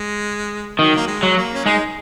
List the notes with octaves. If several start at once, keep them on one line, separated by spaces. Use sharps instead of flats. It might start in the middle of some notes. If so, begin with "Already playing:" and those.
Already playing: G#3
D#3 F#3
A#3
G#3
F#3
A#3
C#4
G#3 D#4